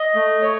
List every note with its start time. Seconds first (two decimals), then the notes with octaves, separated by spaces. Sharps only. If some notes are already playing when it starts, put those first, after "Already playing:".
Already playing: D#5
0.15 A3
0.42 C#5